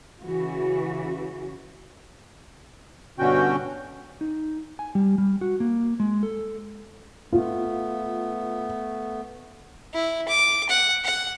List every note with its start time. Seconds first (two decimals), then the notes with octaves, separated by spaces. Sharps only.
0.23 C#3 E3 F#4
3.19 G2 B2 D3 C#4 F#4 G5
4.21 D#4
4.79 G#5
4.95 G3
5.18 G3
5.41 F#4
5.60 A#3
6.00 G#3
6.23 A4
7.33 A3 B3 F4
9.93 E4
10.28 D6
10.69 F#5
11.04 F#5